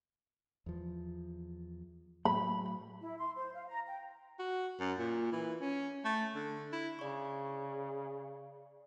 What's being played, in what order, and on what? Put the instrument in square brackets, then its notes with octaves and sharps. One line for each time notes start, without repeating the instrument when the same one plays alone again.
[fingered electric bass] E2 F3
[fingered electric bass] A2 F#3 [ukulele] B5
[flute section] E4
C6
C5
F5
A#5
G5
[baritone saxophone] F#4
F#2
A#2
E3
C#4
A3
D3
E4
[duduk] C#3 [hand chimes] D5 C#6